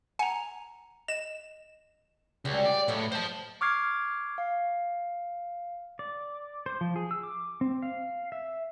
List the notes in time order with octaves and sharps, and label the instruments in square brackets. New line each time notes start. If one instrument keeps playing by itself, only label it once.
[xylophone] F#5 A#5 [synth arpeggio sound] G#5
[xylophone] D#5 [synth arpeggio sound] E7
[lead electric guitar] C#2 [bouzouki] G3 F#4
[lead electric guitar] D5
[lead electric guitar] A2 [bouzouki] F#3 G#3 B4
[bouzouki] A#3 D#4 [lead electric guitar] C5 A5
[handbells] C#6 D6 F6 G#6 C7
F5
[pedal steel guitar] D5
C5
F3
G#4
E6
D6
C4
F5
E5